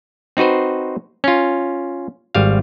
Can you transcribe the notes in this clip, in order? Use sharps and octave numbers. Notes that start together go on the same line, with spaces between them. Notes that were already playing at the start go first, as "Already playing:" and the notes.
C4 D#4 F#4 B4 C5
C#4 F4
G#1 G3 F5